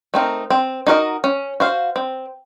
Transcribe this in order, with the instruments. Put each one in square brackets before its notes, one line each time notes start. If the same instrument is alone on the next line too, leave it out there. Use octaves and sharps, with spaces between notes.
[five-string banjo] A3 C4 D#4 A#4
C4
D#4 F#4 A#4 D#5
C#4
F#4 C5 F5
C4